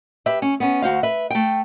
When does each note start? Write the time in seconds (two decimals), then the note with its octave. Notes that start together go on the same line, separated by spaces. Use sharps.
0.26 G4 B4 E5
0.42 C#4
0.60 B3 C#4
0.82 D2 F#4 C5 F5
1.03 B4 E5
1.30 A3 G5